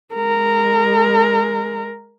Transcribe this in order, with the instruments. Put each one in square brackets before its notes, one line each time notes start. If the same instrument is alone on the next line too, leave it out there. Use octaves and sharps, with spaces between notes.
[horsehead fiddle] G#3 A#4